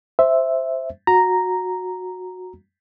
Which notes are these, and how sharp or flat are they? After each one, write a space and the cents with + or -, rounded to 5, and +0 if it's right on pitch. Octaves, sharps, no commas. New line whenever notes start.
C5 +0 E5 +0
F#4 -15 A#5 +0